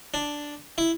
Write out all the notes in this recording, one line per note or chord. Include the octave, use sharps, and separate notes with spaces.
D4
E4